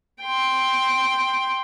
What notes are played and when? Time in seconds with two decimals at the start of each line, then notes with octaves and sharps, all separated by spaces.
0.23 G5 C6